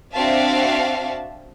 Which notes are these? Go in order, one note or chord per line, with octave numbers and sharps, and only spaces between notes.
C4 D4 F#4 E5 F5 A5